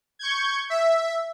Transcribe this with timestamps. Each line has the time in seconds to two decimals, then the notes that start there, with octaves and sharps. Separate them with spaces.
0.19 C#6 G6 G#6
0.70 E5